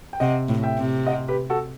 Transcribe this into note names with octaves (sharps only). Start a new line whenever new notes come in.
G5
C3 D#5 F#5
A2
E5 G5
C3
D#5 F#5
G4 B4
F#4 A4